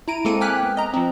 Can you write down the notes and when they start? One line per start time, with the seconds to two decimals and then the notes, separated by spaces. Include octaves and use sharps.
0.08 E4 A#5 D7 D#7
0.25 G#3 A#3 C4 A4 C#7 D#7
0.41 G5 G#5 D6 F6 F#6 B6
0.63 B3
0.77 D#5 A#5
0.93 F3 C4